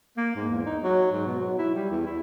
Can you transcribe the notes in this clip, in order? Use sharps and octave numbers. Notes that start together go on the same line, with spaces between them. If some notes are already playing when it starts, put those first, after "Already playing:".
A#3
G#2
E2
D#4
F#3
G#2
B2
F#3
E4
G3
E2
E4